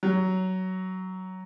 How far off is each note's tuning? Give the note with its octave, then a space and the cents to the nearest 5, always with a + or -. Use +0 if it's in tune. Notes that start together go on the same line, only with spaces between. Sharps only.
F#3 +15